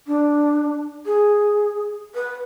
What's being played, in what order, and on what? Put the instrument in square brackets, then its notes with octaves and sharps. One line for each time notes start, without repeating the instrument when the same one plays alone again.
[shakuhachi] D4
G#4
B4